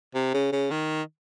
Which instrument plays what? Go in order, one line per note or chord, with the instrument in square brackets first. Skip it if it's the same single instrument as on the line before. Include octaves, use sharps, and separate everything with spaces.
[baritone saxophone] C3
C#3
C#3
D#3